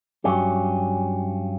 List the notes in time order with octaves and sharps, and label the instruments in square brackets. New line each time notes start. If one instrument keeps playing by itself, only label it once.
[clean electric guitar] G2 F#3 C#4 G4